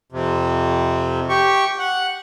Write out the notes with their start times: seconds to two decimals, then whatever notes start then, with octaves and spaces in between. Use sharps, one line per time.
0.12 F2 C3
1.29 G4 C#6
1.79 F#5